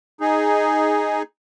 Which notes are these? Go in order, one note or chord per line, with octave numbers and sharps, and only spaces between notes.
D#4 G#4